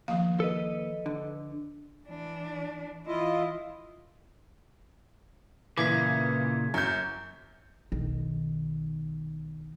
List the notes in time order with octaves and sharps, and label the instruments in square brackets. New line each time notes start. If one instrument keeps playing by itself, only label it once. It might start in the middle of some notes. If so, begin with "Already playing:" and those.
[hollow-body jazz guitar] D#2 [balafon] F3 F5
[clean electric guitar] A4 B4 D#5
[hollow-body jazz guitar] D3
[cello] E3 D4
[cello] E3 E4 [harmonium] F4 D#5
[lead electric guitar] A#2 C#3 [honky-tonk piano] E3 [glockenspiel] D6 G#6 B6
[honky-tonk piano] F#2 G6
[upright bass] B1 D#3